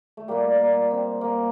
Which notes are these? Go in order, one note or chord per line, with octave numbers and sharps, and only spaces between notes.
A3
A#2 G3 A#3
A#3
C4
A#3